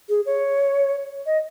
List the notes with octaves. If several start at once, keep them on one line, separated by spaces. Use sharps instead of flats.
G#4
C#5
D#5